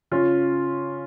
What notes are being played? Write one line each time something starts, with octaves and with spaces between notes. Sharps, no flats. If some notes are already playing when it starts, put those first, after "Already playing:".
C#3 C#4 F4